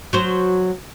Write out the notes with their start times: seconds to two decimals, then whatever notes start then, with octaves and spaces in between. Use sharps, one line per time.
0.13 F#3 C5